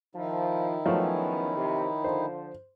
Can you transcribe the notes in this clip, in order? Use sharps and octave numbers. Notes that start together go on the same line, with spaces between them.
D#3 F3 D#4 E4
E2 F3 F#3 A3 B3 C#4
C3
D3 F3 C5